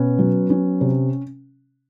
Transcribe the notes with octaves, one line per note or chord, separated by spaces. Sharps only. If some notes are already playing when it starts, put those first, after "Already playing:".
Already playing: B2 B3 C#4 B4
F#3
C#4
C3